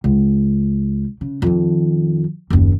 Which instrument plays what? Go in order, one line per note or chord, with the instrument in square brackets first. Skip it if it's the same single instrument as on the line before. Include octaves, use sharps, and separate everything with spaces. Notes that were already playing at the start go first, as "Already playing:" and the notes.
[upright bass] C#2
C#3
F2 D#3
F#1 D#2